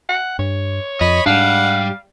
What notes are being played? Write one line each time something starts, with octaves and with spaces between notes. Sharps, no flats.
F#5
G2 C#5
F2 D#5 B5
G#2 G3 D4 F5 F#5